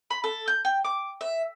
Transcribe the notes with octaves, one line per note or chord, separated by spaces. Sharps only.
B5
A4
G6
G5
D6
E5